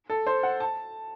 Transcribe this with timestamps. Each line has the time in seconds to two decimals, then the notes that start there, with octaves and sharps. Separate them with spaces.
0.10 A4
0.27 C5
0.43 F#5
0.60 A5